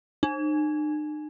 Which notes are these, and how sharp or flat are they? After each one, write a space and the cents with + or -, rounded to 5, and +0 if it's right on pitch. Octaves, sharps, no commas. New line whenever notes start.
D#4 -45